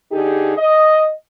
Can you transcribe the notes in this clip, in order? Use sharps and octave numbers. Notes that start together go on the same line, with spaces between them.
D3 D#4 G4 G#4
D#5